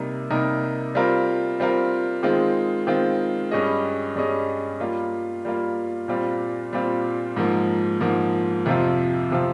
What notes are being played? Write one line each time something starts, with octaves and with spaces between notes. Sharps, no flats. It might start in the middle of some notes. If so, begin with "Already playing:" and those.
Already playing: C3 G3 A#3 D#4 A#4
C3 G3 A#3 D#4 A#4
G3 C4 F4 A#4
G3 C4 F4 A#4
D#3 G#3 C4 F4
D#3 G#3 C4 F4
G2 G3 C#4 G#4 D#5
G2 G3 C#4 G#4 D#5
G3 A#3 F4
G3 A#3 F4
A#2 G3 C4 F4
A#2 G3 C4 F4
G#2 F3 A#3
G#2 F3 A#3
F2 C3 F3 C4 F4
C3 F3 C4 F4